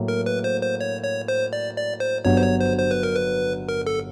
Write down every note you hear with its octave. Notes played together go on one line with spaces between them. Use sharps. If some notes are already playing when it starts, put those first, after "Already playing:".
Already playing: A2 F#3 A#3
A#4
B4
C5
C5
C#5
C#5
C5
D5
D5
C5
G1 G2 D3 F#3 C#5
C5
C#5
C5
C5
B4
A#4
B4
A#4
A4